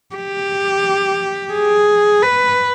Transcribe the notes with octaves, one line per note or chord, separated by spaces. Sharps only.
G4
G#4
B4